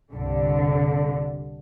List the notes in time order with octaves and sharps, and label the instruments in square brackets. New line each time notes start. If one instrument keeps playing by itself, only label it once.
[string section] C2 G2 D3